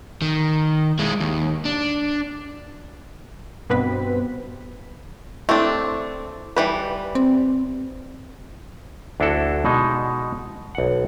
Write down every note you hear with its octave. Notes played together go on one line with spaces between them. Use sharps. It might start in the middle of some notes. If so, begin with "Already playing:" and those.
D#3
G#3 E4
D#2
D4
G2 B2 B3 C4 B4 B6
A3 C4 D4 E4
E3 G3 B4
C4
D2 D4 E4 F#4 A4
B2 G#3 D#4
B1 F#5